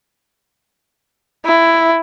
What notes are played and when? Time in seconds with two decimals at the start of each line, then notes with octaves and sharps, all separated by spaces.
1.45 E4